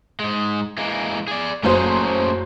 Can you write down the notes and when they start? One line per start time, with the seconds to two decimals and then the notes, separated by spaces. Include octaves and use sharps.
0.20 G#2 G#3
0.77 E3 G#3 A#3
1.27 G#4 D5
1.63 F#1 F#3 A3 C#4 G#4 C5